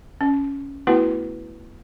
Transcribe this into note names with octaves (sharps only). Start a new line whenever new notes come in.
C#4
A3 B3 E4 F#4 B4 F#5